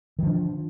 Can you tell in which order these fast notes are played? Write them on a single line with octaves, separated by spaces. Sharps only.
D#3 F3 D4